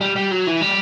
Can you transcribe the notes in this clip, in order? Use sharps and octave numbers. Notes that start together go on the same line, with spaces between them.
G3
G3
F#3
E3
G3